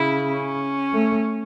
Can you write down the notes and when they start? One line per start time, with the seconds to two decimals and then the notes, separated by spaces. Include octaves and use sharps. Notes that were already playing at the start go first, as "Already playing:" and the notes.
Already playing: C#3 E4
0.31 C#4
0.92 A3